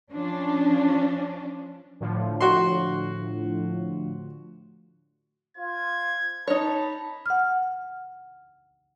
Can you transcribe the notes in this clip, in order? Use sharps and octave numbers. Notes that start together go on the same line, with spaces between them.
F3 C#4 D4
A2 D3 F3
F#4 C6
F4 C5 G#6
D#4 C#5 A5 B5
F#5 F6